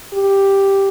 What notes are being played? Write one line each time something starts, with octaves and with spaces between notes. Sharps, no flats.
G4